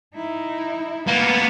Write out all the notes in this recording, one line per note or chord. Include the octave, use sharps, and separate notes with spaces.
D#4 E4
A#3 B3 B4